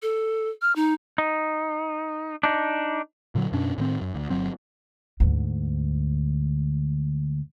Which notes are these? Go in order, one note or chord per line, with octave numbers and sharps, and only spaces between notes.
A4
F6
D#4
D#4
D4 D#4
A#2 D3 D#3 F#3
F#2 B2 C#4 D4
A2 D#3 C4
F#2
D2
G1 F#3 C4
D2 G#2